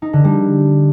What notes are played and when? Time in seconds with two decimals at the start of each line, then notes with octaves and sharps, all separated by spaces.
0.02 D#4
0.13 D3
0.24 G3